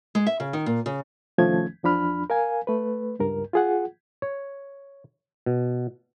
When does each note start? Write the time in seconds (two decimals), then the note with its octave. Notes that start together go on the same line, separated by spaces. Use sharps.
0.15 G#3
0.26 E5
0.40 C#3
0.53 D#3
0.66 A#2
0.86 C#3
1.38 C2 D#3 F3 A3 C#4 G#6
1.83 E2 F3 D4 B5 F6
2.30 A#4 F5 G#5
2.67 A3 B4
3.19 C#2 G2 A#4
3.53 F4 G#4 F#5
4.22 C#5
5.46 B2